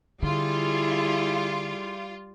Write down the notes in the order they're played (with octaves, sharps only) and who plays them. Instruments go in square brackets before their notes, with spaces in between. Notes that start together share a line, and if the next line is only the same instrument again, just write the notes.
[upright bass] D3 [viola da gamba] G3 [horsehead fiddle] E4 G#4 [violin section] F4